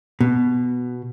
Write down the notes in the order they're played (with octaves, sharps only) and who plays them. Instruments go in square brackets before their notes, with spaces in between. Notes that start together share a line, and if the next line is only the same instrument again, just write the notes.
[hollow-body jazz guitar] B2